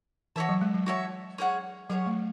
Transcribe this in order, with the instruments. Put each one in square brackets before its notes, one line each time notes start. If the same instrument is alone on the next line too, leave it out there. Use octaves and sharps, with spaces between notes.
[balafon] E3 [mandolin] F#4 C#5 E5 A5
[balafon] F#3
G#3
F#3
[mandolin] F#4 C#5 E5 A5
C#4 G#4 C#5 F#5
[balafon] F#3 [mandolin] C#4 G#4 C#5 F#5
[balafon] A3